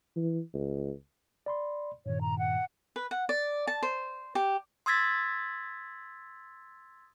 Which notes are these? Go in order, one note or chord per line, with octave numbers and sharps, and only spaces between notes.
E3
C#2
D5 B5 C6
G2 A#2 D#3 C#5
A#5
F#5
B4
F#5
D5
A5
C5
G4
C6 D#6 E6 G#6 A6 B6